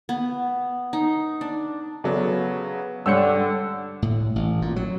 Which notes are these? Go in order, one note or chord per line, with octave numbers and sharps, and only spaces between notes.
B3
D#4
D4
C#3 F#3 B3 A4 D5
G2 D3 C#5 F#5 E6 G6 C#7
A2
A1
A#2
F#3